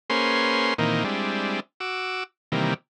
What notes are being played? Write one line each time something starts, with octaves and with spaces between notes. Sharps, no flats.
A#3 C#4 G#4 B4 C5 C6
A#2 D#3 E3 A#3 C4 D#4
G3 G#3 C4 D4 E4
F#4 D6 E6
C3 D#3 E3 G3 A#3